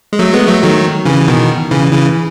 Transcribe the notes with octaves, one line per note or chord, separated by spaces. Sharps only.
G#3
F#3 A3
G#3 B3
F#3 A3
D#3 F#3
C#3 E3
B2 D#3
C#3 E3
C#3 E3